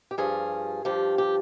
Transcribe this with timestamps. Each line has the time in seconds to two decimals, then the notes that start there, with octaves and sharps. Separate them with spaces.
0.11 G4
0.18 G2 F3 G#4
0.85 G2 F3 G4
1.18 G4